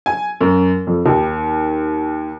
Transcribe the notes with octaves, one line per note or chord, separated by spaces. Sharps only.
G#5
F#2
F2
D#2